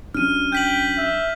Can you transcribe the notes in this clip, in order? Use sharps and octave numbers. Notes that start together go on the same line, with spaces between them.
F#3 C#4 D4 F6 D#7
G5 G6 B6 F#7
E5